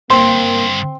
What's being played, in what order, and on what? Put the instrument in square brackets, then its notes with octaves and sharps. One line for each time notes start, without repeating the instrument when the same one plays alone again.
[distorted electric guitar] G2 D3 [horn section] A#3 [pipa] C4 [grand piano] C6